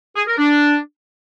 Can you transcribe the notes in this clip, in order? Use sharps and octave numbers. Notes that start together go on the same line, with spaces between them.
G#4
A#4
D4